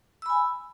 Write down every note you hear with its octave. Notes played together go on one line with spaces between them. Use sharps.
G#5 B5 E6